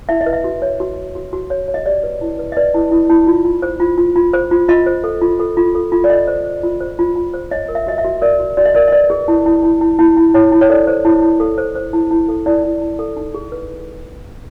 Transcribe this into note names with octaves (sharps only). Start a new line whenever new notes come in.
E4 E5
D#5
B4
E5
F#4
C#5
F#4
F#4
F#4
F#4
C#5
C#5
D#5
G4 D5
B4
E4
B4
D#5
B4 D5
E4
E4
E4
F4
F4
C5
F4
F4
F4
C5
F4
F4 D#5
C5
A4
F4
A4
F4
A4
F4
D5
A4 D#5
C5
C5
F4
C5
F4
F4
C5
C#5 D#5
A#4
E5
F#4 D#5
E5
F#4
A#4 D5
F#4
F#4 D5
D#5
A#4 D5
D#5
B4 D5
G#4
E4
E4
E4
E4
E4
E4
E4 C#5
E4
C#5
A4 D5
C5
E4
E4
A4
C5
C5
E4
E4
A4
E4 D5
E4
E4
A4
D#4
G#4
B4